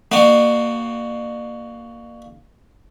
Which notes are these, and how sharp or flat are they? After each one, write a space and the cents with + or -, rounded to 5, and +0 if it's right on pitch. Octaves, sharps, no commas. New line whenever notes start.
A#3 +0 D4 +40 F#4 +10